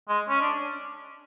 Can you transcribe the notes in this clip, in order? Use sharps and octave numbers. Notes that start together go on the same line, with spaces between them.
G#3
C#4
D4